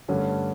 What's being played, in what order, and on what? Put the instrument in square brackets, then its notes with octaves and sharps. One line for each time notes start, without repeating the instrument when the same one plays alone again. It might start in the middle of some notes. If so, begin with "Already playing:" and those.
[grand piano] G2 D3 A3 C#4